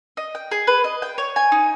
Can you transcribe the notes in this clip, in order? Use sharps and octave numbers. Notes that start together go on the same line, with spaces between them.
D#5
G5
G#4
B4
D#5
G5
C#5
G#5
D#4